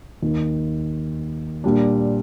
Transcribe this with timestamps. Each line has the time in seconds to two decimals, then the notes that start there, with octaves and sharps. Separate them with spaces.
0.22 D#2 D#3 A#3
1.64 A#2 G3 D4